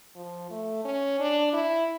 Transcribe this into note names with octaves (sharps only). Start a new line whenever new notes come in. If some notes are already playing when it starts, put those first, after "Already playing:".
F3
A3
C#4
D4
E4